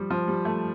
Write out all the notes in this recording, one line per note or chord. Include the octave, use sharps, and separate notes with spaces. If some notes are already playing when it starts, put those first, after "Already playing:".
Already playing: F3 G3
F3
G3
A3